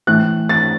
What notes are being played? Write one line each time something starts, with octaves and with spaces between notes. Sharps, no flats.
A2 E3 F#6
A6